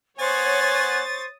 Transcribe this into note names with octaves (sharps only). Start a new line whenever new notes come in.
B3 C5 C#5 F#5 G#5 C#6 D#6 A6